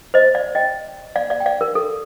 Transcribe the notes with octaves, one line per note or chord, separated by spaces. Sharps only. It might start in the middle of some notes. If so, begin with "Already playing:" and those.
C5 D#5
D5 F5
D#5 G5
D5 F5
D5 F5
G5
D5 F5
A#4
A4